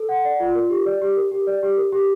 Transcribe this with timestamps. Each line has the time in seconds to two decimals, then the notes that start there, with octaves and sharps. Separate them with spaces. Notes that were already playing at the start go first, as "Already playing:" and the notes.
Already playing: A4
0.09 F#5
0.25 D5
0.40 F4
0.55 A#4
0.70 G4
0.86 D5
1.02 G4
1.17 A#4
1.31 G4
1.47 D5
1.63 G4
1.78 A#4
1.92 G4